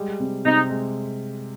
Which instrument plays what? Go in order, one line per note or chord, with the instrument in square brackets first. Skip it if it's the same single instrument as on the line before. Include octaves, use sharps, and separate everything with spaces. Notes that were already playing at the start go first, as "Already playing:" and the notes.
Already playing: [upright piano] G3 G#3
C3
[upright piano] C3 [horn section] D#4
[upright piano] G#3